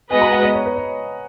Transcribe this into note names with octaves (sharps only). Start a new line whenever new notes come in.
G#3 B3 F#4 B4 D#5 G#5
A#5
F#5
D#5
C#5
B4
C#5